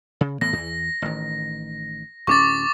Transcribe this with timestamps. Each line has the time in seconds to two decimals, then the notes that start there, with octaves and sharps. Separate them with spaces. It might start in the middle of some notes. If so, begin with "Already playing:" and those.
0.21 C#3
0.41 A2 E3 B3 A#6
0.53 E2 E3
1.02 A1 D#3
2.27 D1 C4 C#4 C#6 D6 A6